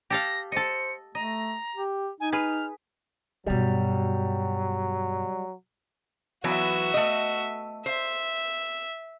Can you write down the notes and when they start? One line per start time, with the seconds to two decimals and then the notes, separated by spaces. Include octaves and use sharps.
0.10 G4 A4 F5 A#6
0.52 A4 C5 D#5 C#7
1.15 A3 D#5 A#5
1.76 G4
2.20 D#4 G#5
2.32 G#4 B4 F6
3.46 G2 B2 F#3 G3
6.44 E3 F#3 B3 F#4 E5
6.94 A3 D#5
7.86 C5 E5